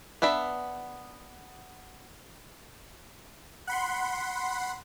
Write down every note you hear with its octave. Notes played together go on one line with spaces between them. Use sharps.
B3 D4 E5 B5
F#5 B5 C6